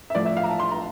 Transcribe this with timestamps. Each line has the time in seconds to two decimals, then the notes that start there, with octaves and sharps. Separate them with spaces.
0.10 E5
0.15 A1 A2 F3 D5
0.25 E5
0.37 F5
0.43 A#5
0.48 A5
0.60 C6
0.71 A#5